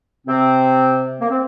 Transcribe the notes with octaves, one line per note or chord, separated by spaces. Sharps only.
C3 C4
A#3
C4